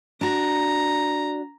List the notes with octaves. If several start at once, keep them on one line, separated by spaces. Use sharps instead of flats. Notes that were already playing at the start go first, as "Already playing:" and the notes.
D4 F#4 A#5